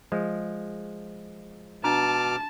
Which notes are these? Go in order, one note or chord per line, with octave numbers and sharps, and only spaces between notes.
F3 G#3
B2 D4 A5 A#5 D6 F6